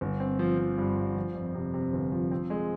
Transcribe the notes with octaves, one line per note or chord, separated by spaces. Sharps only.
G1
C4
F3
F3
G2
G2
F3
F2
C3
C3
G1
F3
C4
G#3